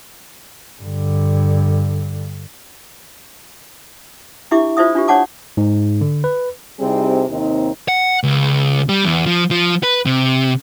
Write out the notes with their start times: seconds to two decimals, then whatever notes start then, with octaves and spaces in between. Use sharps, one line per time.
0.81 G2 D3
4.51 D4 E4 G4 E5 D6
4.77 F4 C5 D5 E5 D#6
4.95 D4 F4 G4
5.08 D4 C#5 D5 F#5 A5 D6
5.57 G#2
6.01 D3
6.24 B4
6.80 C3 G3 C4 D#4 E4 G#4
7.30 D#2 C3 C4 D#4
7.88 F#5
8.23 C#2
8.89 G3
9.05 E2
9.26 F3
9.51 F3
9.83 B4
10.06 C3